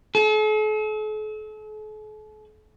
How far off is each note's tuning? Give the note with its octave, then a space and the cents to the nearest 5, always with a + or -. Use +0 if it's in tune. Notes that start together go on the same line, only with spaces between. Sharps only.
A4 -45